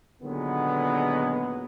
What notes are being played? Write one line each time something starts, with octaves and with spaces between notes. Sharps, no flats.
A#2 D3 D#3 F#3 G#3 B3